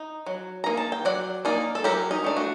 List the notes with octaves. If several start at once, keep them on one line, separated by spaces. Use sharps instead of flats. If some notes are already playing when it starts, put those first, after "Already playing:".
Already playing: D#4
F#3
A#3 D#4 A#5
A5
G5
F#3 D5 F#5
A#3 D#4 A#4 D5
A4
F#3 G4 A#4
D#4
A3 D4
F#4